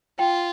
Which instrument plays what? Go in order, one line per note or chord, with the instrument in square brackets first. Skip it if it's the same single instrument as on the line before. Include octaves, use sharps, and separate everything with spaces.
[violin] F4 [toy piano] G5